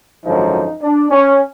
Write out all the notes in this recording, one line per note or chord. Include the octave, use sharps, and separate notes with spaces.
G#1 F#2 D3 F3 D#4
D4
C#4